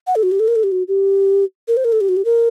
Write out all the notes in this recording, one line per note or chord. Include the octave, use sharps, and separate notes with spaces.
F#5
A4
F#4
G4
A4
A#4
A4
G4
F#4
G4
A#4
C5
A#4
A4
G4
F#4
G4
A#4